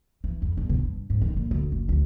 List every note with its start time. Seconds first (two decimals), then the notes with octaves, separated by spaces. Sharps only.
0.24 E3
0.42 F2
0.57 G1
0.69 B2
0.84 G2
1.10 G#2
1.22 D#3
1.37 A#2
1.51 D2
1.72 F#1
1.89 D2